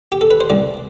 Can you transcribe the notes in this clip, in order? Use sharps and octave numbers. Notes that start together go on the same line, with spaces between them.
G4
A4
B4
C5
C2 D5